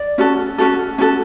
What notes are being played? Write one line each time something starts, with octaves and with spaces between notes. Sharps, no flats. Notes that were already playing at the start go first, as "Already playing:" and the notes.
Already playing: D5
C#4 F#4 A4
C#4 F#4 A4
C#4 F#4 A4